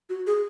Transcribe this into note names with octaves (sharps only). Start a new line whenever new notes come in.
F#4
G#4